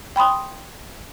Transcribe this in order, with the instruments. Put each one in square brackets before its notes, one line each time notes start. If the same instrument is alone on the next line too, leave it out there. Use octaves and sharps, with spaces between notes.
[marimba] G5 B5 C6 D#6